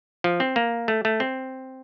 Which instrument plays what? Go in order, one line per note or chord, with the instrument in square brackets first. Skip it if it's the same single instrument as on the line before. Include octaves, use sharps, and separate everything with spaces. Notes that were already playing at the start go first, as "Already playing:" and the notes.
[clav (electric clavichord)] F3
C4
A#3
A3
A3
C4